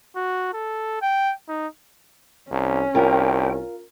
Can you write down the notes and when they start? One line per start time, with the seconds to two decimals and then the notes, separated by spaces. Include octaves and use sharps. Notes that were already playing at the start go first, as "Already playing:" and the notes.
0.16 F#4
0.53 A4
1.02 G5
1.49 D#4
2.51 C2 C#4
2.95 C2 F4 A#4 G5